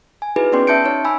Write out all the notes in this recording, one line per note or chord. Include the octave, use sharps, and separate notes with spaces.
G#5
D#4 E4 F#4 G#4 B4
B3 C#4 D5 G5 C6
C#4 E5 A5 G6 C#7 D7
D#4 C#5
G#5 B5 E6